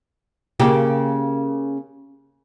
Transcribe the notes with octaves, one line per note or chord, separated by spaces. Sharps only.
C#3 A#3 G4